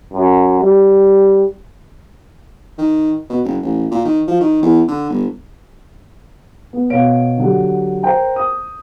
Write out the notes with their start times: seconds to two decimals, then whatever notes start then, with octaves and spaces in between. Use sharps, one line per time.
0.13 F#2
0.60 G3
2.78 D#3
3.30 B2
3.44 F#1
3.62 A1
3.91 A#2
4.05 D#3
4.28 F3
4.41 D#3
4.63 E2
4.88 D3
5.10 G1
6.73 B3
6.90 B2 C#5 F5 D7
7.38 D3 F#3 G4
8.03 A#4 C5 G5 A#5
8.36 D#6